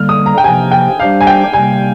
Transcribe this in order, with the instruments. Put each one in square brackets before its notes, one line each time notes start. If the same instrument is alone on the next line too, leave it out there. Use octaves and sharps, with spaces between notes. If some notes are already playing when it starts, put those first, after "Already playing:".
Already playing: [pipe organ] D3 G3 A#3 [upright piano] F6
[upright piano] D#6
A#5
G5
[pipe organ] C3 F3 A#3 [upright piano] G#5
[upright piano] G5
[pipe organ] G3 D4 G4 C5 [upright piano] F5
[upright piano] G#5
G5
[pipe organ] C3 G3 A#3 [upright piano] G#5